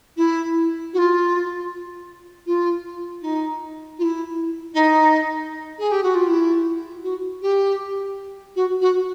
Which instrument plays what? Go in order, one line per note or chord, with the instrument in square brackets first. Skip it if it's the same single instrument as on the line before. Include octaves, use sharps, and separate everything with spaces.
[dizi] E4
F#4
F4
F4
D#4
F4
E4
D#4
G#4
G4
F#4
F4
E4
F#4
G4
F#4
F#4